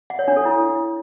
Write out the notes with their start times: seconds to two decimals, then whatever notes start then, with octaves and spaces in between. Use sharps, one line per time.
0.10 F#5
0.19 C#5
0.28 D4
0.37 A4
0.45 E4